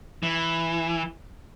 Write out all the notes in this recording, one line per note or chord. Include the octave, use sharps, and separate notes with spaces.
E3